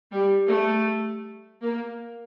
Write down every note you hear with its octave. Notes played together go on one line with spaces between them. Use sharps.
G3
A3
A#3